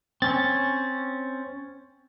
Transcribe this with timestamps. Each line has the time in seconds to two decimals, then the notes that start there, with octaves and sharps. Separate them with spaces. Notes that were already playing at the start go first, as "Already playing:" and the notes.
0.22 C4 C#4 A6